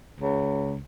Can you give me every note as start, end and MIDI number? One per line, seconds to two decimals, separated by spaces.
0.20 0.78 37